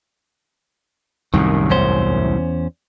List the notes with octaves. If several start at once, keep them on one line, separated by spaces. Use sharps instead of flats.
C2 F#2 A2 D#3
E2 C#4 C5